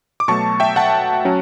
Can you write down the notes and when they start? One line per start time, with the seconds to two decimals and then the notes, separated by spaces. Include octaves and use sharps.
0.20 D6
0.28 B2 F#3 A3 A5 C#6
0.60 E5 G5
0.76 F#5 A5
1.25 F#3 C#4